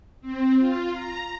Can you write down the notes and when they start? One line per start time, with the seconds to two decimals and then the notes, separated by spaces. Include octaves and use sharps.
0.21 C4
0.58 F4
0.93 A#5